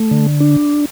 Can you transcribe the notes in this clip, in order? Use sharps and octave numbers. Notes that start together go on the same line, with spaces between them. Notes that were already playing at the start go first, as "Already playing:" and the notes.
Already playing: A3
D3
D4